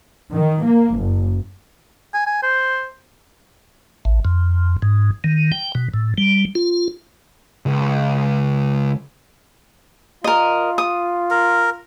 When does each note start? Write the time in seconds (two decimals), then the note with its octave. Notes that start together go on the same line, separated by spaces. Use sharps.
0.33 D#3
0.64 A#3
0.96 F#1
2.14 G#5
2.26 G#5
2.43 C5
4.05 A1
4.25 F2
4.82 G#2
5.24 D#3
5.52 G5
5.75 B2
5.94 A2
6.18 G3
6.55 F4
7.66 C#2
10.24 F4 A#4 D#5
10.78 D#6
11.31 A#4